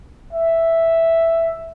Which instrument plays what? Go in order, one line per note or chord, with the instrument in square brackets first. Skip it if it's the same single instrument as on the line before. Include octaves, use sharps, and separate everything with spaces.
[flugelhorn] E5